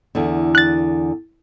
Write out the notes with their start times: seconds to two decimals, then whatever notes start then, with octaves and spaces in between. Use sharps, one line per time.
0.15 E2 D3
0.55 F#6 A6